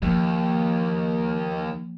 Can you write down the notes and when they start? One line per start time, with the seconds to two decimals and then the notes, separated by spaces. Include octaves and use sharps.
0.02 D#2 F3 A#3